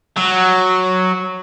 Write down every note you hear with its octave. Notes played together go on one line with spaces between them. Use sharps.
F#3